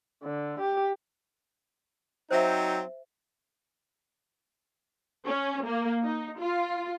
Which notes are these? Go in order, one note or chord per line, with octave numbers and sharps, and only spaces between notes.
D3
G4
F#3 C4 D#4 C5 E5
C#4
A#3
D#4
F4